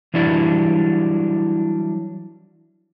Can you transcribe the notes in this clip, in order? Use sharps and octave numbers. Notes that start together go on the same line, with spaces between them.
E3 F#3 G3 D4 E4 D5